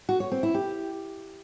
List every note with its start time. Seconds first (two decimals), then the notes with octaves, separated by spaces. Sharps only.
0.09 F#4
0.20 C#5
0.32 C4
0.43 E4
0.54 G4